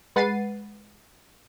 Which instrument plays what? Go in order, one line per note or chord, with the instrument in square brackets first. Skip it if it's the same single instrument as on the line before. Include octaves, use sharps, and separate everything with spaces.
[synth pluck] G#3 B4 F#5 A6 C7 D#7